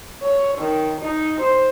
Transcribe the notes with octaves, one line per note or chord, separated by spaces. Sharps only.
C#5
D#3
D#4
C5